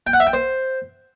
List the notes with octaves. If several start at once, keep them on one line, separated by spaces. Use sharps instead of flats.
G5
F#5
E5
G5
C5